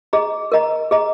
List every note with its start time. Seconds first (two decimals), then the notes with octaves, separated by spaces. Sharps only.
0.13 G#4 D#5 A#5
0.52 A#4 D#5 A#5
0.91 G#4 D#5 A#5